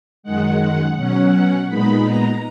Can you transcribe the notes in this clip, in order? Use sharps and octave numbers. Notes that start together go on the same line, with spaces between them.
F#2 D#3 G#3 F#5
B2 F#3 C#4 F#5
A#2 G#3 B3 D#4 B5
A#5